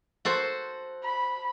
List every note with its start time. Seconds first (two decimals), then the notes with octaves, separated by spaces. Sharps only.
0.25 F#4 A4 C5
1.03 B5